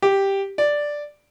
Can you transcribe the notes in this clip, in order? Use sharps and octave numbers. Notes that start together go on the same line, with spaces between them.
G4
D5